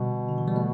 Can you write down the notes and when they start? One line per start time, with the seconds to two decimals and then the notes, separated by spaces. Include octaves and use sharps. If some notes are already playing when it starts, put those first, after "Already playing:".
Already playing: B2 D3 G3
0.28 D3
0.38 E3
0.47 G3
0.56 A3